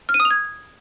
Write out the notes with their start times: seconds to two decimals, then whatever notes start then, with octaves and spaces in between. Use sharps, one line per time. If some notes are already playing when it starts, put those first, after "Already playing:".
0.09 F6
0.14 D#7
0.20 D#6
0.25 F7
0.31 G#6